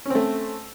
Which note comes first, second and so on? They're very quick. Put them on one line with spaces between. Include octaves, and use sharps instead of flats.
C#4 C4 A3